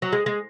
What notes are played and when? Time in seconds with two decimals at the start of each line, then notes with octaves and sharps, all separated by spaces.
0.02 F#3
0.12 G#3
0.26 G#3